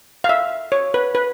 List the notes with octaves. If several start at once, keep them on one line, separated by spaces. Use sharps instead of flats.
F5
E5
C#5
B4
B4